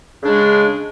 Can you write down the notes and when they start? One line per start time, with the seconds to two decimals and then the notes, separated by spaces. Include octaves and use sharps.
0.22 C#3
0.24 D4
0.27 G#3